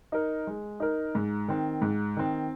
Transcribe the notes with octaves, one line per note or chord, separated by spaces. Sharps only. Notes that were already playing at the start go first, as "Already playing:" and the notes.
D#4 A#4
G#3
D#4 A#4
G#2
D#3 C4
G#2
D#3 C4